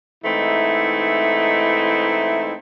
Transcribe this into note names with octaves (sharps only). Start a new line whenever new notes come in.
G#2 E3 A3 C4 D#4 E4